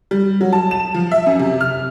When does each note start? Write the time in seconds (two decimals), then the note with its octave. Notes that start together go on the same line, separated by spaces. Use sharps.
0.11 G3
0.41 F#3
0.53 A5
0.71 E7
0.94 F3
1.11 E5
1.26 F#2
1.39 C3
1.61 F6